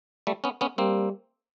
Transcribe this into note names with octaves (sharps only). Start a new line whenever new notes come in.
G3 A3
B3 C#4
B3 C#4
G3 A#3 C4